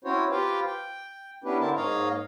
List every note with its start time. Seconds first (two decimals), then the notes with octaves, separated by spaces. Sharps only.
0.05 C4 C#4 E4 F#4 C5 C#5
0.31 F4 G4 B4 C5 F5 G5
0.67 G5
1.44 B3 C#4 D4 E4 G4 B4
1.60 D3 C4 E4 A#4 A5
1.76 G#2 A#3 C#5 D#5 F5 A#5